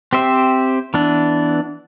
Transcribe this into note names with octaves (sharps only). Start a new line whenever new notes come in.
C4 G4 C5 E5
E3 B3 D4